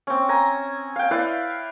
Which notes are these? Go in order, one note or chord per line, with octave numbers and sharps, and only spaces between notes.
C4 C#4
G#5 A#5
F5 G5
E4 B4 D5 F5